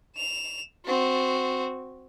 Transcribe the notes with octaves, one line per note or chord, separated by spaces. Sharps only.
E7 F7
C4 F#4